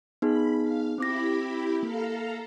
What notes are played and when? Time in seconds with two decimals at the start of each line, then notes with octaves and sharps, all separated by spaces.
0.22 B3 D#4 G#4 B5
0.63 F5
0.98 C4 E4 G4 B5 D6 A#6
1.83 A#3 A4 F5 A#5